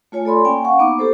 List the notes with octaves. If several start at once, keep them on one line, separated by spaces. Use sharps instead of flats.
A3 F4 C#5 G#5
A4 D5 B5 C6
A#3 C#4 G5 G#5
F5 F#5 C#6
A#3 B3 D#4 D6
G4 A4 C5